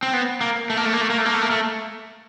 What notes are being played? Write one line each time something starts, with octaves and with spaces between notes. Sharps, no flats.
C4
B3
A#3
A3
A#3
A3
A#3
A3
A#3
A3
A#3
A3
A#3
A3